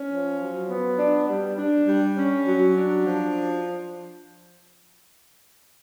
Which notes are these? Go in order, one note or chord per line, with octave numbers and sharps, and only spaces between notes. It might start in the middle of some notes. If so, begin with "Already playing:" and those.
Already playing: C#4
F3
F#3
B3
D4
G3
D4
G3
C#4
F#3
D4
F3